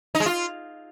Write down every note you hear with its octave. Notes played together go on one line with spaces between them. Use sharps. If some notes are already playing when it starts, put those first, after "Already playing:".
D#4
G#3
F4